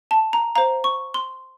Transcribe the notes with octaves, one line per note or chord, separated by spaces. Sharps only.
A5
A#5
C5 F5 A#5
C#6
C6